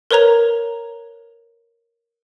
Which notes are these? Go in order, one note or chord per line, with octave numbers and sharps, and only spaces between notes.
A#4 B4 C#5 A#5 F7